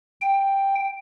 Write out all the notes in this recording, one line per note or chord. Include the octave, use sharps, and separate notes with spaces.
G5